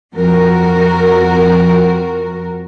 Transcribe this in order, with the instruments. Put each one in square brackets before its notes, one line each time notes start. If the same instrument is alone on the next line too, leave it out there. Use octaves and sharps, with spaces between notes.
[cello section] F2 F#4 A#4